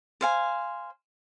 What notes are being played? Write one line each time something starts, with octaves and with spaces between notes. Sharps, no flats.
C5 F5 G#5